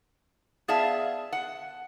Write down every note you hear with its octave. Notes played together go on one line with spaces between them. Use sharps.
B3 G#4 D5 E5 F5 A5
F#5